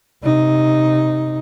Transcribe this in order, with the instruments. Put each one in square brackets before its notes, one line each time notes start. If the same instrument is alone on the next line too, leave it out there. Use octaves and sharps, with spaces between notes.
[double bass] C3 D#4